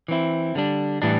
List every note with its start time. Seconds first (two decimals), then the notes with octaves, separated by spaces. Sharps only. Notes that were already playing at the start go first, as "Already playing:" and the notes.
0.08 E3 C4 E4
0.55 D3 G3 D4
1.02 A2 E3 G3 D4